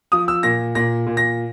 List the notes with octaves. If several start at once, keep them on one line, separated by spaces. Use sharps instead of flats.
F3 D#6
E6
A#2 A#6
A#2 A#6
A#2
A#6